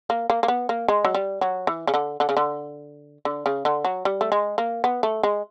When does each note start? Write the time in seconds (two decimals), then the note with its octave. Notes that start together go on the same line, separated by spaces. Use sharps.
0.10 A#3
0.30 A#3
0.43 A#3
0.48 B3
0.69 A#3
0.88 G#3
1.05 F#3
1.15 G3
1.41 F#3
1.67 E3
1.87 C#3
1.94 D3
2.20 D3
2.29 C#3
2.37 D3
3.25 D3
3.46 C#3
3.65 D3
3.85 F#3
4.05 G3
4.21 A3
4.32 G#3
4.58 A#3
4.84 B3
5.03 A3
5.23 G#3